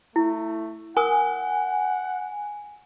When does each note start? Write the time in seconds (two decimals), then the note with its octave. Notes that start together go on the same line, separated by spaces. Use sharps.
0.16 A3 E4
0.97 A#4 F#5 G#5 D#6